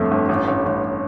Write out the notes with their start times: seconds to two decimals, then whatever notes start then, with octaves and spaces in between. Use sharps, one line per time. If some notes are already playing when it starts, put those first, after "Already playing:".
Already playing: G1 F2 D3 A3
0.11 G1
0.29 A1
0.48 A1
0.66 A1